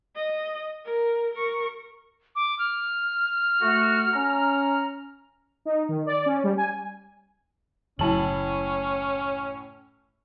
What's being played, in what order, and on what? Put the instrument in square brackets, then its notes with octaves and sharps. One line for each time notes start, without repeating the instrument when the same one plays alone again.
[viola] D#5
A#4
A#4 C#6
[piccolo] D6
F6
[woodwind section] A3 F#4
C#4 A#5
[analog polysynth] D#4
D#3
D5
C#4
G3
G#5
[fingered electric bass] F#1 F#3 [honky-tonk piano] A2 A5 F#7 [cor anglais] C#4